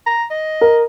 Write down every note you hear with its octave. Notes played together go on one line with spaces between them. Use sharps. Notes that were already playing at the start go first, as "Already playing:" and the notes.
A#5
D#5
A#4